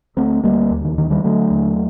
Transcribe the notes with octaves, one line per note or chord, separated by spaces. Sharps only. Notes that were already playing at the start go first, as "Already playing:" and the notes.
D2 A3 C4
D2 G3 A#3
D#2
D#3
D3 D#3
D#3 G3
D3 F#3 A3
D#2